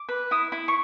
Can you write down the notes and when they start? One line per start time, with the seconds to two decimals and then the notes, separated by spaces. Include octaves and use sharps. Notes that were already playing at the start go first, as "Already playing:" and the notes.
Already playing: D6
0.09 B4
0.31 E4 D#6
0.52 E4
0.68 C#6